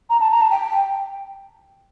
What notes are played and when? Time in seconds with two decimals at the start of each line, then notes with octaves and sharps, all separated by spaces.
0.10 A#5
0.20 A5
0.31 A#5
0.41 A5
0.50 G5